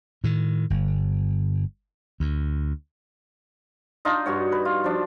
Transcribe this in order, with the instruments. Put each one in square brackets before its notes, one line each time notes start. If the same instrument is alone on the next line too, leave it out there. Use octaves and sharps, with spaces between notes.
[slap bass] A2 D#3
G1
D2
[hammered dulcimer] D4 D#4 F4 D#5
G2 F#4 C#5
B4
F4
F3 D4